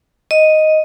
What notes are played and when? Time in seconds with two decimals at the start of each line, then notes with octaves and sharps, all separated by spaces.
0.31 D#5